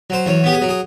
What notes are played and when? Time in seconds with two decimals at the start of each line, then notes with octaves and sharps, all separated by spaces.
0.10 F#3 C5
0.26 E2 C#5
0.44 B3 G4
0.53 G#4
0.62 F#3
0.69 G#4